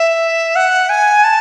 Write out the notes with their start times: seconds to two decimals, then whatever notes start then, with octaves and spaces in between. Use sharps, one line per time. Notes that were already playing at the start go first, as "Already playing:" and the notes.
Already playing: E5
0.56 F#5
0.89 G#5
1.24 A5